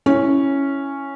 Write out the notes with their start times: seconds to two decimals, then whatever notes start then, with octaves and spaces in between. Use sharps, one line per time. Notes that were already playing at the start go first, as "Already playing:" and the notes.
0.06 C#4 E4